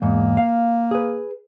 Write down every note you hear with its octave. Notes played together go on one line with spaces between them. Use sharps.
E2 G#2 A#3
F5
G#4 B4